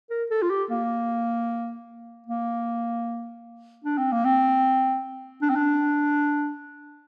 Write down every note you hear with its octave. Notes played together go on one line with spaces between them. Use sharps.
A#4
A4
F4
G4
A#3
A#3
D4
C4
A#3
C4
D4
C4
D4